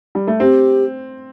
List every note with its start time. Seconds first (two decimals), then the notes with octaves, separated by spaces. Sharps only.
0.15 G3
0.27 A3
0.40 C4 G4